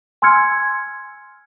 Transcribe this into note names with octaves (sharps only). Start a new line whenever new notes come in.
G#5 C6 E6 F6 G#6 C#7